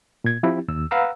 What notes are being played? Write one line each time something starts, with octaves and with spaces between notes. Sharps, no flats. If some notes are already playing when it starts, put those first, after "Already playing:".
A#2 G#6
F3 C4 E4 G4
D#2 E6
B4 F5 F#5 A#5 E6